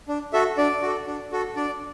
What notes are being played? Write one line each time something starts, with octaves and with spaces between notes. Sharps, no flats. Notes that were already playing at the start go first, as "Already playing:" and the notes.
D4
F#4 A4 E5
D4 D5
F#4 A4
D4
F#4 A4
D4 D5